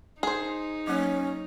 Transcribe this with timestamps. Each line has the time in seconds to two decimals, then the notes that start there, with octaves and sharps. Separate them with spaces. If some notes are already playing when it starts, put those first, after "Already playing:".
0.23 D#4 G#4 C5 G#5
0.87 F#3 A#3 C#4